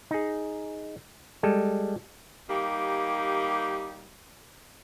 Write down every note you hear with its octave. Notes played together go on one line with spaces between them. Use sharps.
D#4 G#4
G3 G#3 A4
G3 A#3 D#4 G4